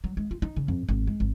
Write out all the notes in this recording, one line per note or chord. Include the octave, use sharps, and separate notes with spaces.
F#3
G#3
F4
D#4
C#3
F2
G#1
G#3
G#1